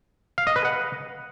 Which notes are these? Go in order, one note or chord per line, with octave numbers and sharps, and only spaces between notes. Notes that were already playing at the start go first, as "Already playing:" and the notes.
F5
D#5
B4
F#5